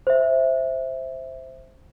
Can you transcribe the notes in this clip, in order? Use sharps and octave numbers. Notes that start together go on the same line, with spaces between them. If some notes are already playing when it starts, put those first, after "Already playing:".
C5 E5